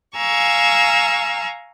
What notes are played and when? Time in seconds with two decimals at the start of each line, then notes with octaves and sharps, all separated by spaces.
0.16 F5 G#5 A#5 C#6 E6